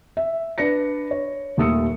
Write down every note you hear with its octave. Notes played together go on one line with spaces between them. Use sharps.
E5
D4 B4 D5 A#6 C#7
C#5
D#1 D#2 A3 D#6 E6 C#7